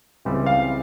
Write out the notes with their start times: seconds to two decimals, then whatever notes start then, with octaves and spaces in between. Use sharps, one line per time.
0.25 C#2 C#3 E3 G3 C4
0.46 F5